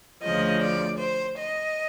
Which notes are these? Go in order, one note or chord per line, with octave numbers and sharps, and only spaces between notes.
D2 C#3 F3 D#5
D5
C5
D#5